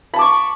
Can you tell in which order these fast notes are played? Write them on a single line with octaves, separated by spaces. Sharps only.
B5 A5 D6 C#6